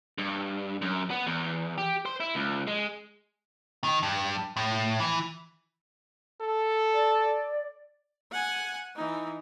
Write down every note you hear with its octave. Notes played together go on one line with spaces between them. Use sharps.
G2
F#2
B3
E2
G4
C5
E4
C#2
G#3
D#3
G2
A2
E3
A4
D5
F#5 G#5
E3 D#4